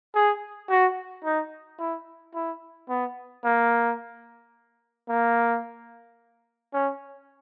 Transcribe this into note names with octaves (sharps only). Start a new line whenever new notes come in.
G#4
F#4
D#4
E4
E4
B3
A#3
A#3
C#4